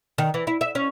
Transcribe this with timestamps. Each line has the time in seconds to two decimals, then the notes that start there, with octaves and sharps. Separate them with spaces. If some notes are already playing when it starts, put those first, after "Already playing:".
0.18 D#3
0.34 E3
0.47 E4
0.61 E5
0.75 C#4